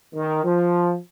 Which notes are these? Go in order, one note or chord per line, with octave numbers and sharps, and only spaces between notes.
D#3
F3